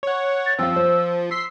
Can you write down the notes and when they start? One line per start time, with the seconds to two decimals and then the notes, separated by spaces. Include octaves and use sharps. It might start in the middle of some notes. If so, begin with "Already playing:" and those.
0.03 C#5 F#5
0.46 A6
0.59 F3 C4 F5 E6
0.76 C5
1.31 C6 E6 B6 C7